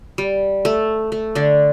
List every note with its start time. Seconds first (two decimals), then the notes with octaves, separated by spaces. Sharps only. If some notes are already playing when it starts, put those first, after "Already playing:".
0.18 G3
0.65 A3
1.12 A3
1.35 D3 D4